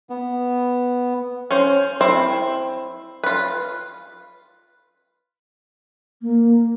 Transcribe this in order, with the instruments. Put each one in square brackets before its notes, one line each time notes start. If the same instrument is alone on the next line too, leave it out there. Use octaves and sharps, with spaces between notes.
[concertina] B3
[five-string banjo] C#4 C5
C4 E4 C5
F4 B4
[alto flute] A#3